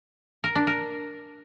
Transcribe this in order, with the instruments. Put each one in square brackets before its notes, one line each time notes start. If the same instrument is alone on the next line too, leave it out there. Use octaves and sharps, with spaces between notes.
[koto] A#4
D4
A#4